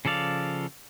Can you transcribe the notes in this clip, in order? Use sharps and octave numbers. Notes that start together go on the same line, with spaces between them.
C#3 F3 A4 D5 F5